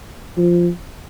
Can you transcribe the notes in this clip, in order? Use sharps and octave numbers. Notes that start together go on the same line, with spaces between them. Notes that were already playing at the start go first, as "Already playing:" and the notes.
F3